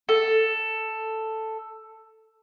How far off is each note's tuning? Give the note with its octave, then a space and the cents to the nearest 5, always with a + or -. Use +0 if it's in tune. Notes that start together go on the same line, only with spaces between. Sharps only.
A4 +5